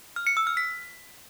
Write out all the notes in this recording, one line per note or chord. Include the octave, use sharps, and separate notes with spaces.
F6
C#7
E6
F6
B6